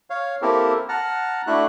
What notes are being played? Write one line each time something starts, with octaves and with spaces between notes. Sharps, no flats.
C#5 F5
A#3 C4 E4 G4 A4 A#4
F#5 A5 A#5 F6
A3 D4 E4 F#4 F#6